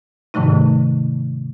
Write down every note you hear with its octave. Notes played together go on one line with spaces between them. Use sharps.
G#2 C3 D#3 F3 A3 D#4